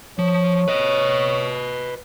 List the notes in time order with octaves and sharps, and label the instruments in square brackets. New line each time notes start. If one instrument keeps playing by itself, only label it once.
[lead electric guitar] F3 [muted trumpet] C#5
[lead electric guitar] B4 D#5